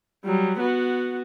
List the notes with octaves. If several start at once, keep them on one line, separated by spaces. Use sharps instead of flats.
F#3 G3
B3 F#4